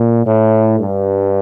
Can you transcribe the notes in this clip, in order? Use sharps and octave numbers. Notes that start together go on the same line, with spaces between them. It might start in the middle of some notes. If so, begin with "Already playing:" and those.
Already playing: A#2
A2
G2